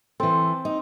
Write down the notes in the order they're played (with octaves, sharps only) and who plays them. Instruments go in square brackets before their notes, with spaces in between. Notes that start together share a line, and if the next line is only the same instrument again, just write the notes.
[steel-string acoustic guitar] E3 A4 [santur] C4
[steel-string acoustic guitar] D#4